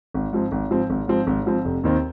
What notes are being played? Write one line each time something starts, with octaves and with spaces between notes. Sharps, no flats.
G#1
G#2 F3 C4
G#1
G#2 F3 C4
G#1
G#2 F3 C4
G#1
G#2 F3 C4
F1
D#2 D#3 C4